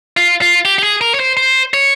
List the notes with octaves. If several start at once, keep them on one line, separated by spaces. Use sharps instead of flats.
F4
F4
G4
G4
G#4
A#4
C#5
C5
C5
C#5